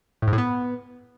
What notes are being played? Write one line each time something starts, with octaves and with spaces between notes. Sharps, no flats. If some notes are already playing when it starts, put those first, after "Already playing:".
A2
G#2
A2
B3